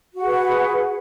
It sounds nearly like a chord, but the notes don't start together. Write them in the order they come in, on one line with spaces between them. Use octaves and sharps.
F#4 F#5 G#4 B4